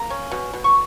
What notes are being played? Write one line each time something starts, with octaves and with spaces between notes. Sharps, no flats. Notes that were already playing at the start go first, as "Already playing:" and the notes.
Already playing: A#3 A#5
C#4
B2
B2
C#6